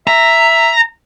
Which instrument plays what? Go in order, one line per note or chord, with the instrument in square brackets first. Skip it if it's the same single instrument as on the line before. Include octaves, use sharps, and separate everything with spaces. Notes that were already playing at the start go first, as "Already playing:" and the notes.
[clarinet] E5 [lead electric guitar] A#5